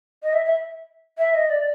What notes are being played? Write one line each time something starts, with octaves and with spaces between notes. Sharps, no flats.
D#5
E5
E5
E5
D#5
D5